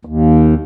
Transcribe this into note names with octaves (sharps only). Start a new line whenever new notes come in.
D#2